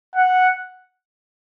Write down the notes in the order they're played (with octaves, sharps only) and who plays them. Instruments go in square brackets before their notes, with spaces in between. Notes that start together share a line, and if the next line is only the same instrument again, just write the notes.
[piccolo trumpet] F#5